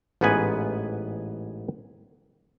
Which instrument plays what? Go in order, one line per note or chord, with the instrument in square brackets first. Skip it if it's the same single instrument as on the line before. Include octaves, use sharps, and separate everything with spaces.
[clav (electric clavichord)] A1 G#2 B3 G#4 B4 G#5